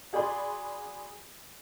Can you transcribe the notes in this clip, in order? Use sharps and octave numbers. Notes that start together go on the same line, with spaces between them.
F#4 G#4 D5 B5 C6